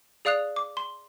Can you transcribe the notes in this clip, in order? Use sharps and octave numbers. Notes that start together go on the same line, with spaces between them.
G#4 D5 F5 D#6 F#6 F7
D6
C6